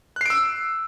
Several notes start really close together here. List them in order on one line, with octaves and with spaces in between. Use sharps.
F#6 C7 D7 E6